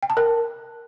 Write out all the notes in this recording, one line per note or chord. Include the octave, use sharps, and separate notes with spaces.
G5
A5
A#4